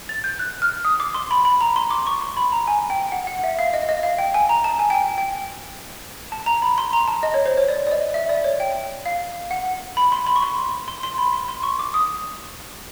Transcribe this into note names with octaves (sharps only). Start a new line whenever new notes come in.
A6
G6
F#6
F6
D#6
D6
C6
B5
B5
A#5
C6
D6
C#6
C6
B5
A#5
G#5
G5
F#5
F#5
E5
F5
D#5
D#5
F5
G5
G#5
A#5
A5
G#5
G5
G#5
G5
A5
A#5
B5
C6
A#5
A5
D#5
C#5
C5
C#5
D5
D5
D#5
E5
D5
C#5
G5
F5
F#5
B5
C6
B5
C#6
C6
C6
C6
B5
C6
C6
C#6
D6
D#6